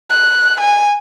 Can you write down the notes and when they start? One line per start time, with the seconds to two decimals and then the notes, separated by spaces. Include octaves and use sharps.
0.10 F#6
0.60 G#5